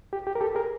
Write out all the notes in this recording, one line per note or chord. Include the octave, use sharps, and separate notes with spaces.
G4
G4
A#4
G4 A4
G#4 A#4